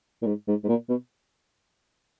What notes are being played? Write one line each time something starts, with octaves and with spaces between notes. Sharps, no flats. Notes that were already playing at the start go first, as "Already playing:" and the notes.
A#2
G#2
G#2
G#2
A#2
B2